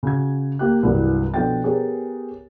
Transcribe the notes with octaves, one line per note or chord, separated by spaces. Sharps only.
C#3 F#4 G#6
A#3 G4 F#6
C2 G2 E3 F#3 G3
B2 F3 D4 A4 G5 A6
B3 G4 G#4 A#4 C#5